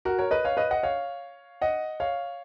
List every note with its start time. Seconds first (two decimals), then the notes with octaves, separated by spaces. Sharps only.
0.05 F#4 A#4
0.18 A#4 C#5
0.31 B4 D#5
0.45 C#5 F5
0.57 B4 D#5
0.71 D#5 F#5
0.83 C#5 F5
1.61 D#5 F#5
2.00 C#5 F5